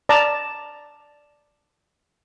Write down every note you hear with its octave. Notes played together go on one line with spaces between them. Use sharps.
D5 A5 A#5